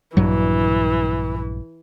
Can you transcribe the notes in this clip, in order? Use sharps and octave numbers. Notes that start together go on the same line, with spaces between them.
A#1 G2 E3 F#3